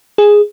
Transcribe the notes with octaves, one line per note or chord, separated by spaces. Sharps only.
G#4